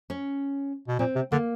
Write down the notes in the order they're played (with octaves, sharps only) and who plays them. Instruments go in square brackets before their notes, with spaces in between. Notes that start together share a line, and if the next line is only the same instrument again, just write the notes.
[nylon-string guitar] C#4
[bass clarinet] B2
[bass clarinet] A#2 [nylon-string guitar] C4
[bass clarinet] C3
[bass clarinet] D3 [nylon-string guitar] A#3